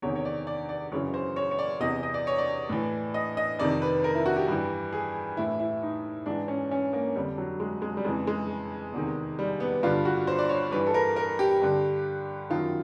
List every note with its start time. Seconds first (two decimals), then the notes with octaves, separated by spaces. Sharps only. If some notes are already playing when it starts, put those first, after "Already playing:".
0.02 E2 C3 D#3 C#5
0.16 C#5
0.25 D5
0.47 D5
0.69 D5
0.92 F#2 C#3 E3 C#5
1.14 C5
1.36 C#5
1.51 C#5
1.59 D5
1.80 E2 C3 E3 D#5
2.03 D#5
2.14 D5
2.27 C#5
2.38 D5
2.69 A2 E3
3.14 D#5
3.37 D#5
3.59 F2 C3 D#3 D5
3.82 B4
4.04 A#4
4.15 E4
4.26 F#4
4.37 G4
4.48 G2 E3
4.92 G#4
5.37 A2 E3 E4
5.60 E4
5.82 D#4
6.26 G#2 E3 D4
6.48 C#4
6.71 C#4
6.93 A#3
7.16 F2 D3 G3
7.38 F#3
7.60 G#3
7.82 G#3
7.97 G3
8.04 F2 C#3 E3 G#3
8.27 G#3
8.93 E2 C3 D#3
9.39 G3
9.60 B3
9.83 G2 D3 F4
10.05 F#4
10.27 C5
10.39 D5
10.49 C#5
10.72 G2 E3 B4
10.87 A4
10.94 A#4
11.16 A#4
11.39 G4
11.62 G2 D3
12.50 F#2 D#3 F4